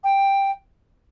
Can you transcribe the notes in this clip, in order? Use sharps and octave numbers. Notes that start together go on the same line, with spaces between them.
G5